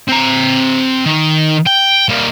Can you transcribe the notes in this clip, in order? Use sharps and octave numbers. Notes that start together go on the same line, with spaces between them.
C4 A#5
D#3
G5
G3 A#3